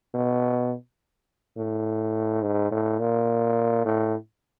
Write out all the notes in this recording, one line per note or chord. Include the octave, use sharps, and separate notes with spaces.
B2
A2
G#2
A2
A#2
A2